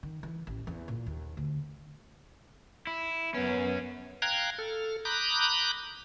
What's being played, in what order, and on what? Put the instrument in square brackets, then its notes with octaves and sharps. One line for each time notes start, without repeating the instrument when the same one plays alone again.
[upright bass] D#3
E3
A1
E2
A#2
D#2
D2
[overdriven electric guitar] E4
[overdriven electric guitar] F#2 C#4 [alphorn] B3
[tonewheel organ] F5 G5 A#5 F#6 G#6
A4 F6
A#5 B5 D6 D#6 F#6 G6